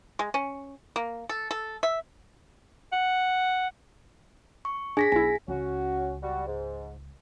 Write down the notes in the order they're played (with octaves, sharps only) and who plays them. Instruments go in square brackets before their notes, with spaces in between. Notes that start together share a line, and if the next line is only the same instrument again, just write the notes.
[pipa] G#3
C#4
A#3
A4
A4
E5
[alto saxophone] F#5
[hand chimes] C#6
[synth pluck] D4 [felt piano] G#4 [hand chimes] G#5 A#6 B6
[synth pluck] B1 E4 [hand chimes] G#5
[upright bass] C#2 [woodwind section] C#4 F#4
[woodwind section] G3 F#4
G#2